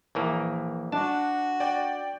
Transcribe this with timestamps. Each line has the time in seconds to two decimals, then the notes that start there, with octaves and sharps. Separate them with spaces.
0.15 A#1 E3 A#3
0.92 D4 F#4 A5
1.60 D5 G5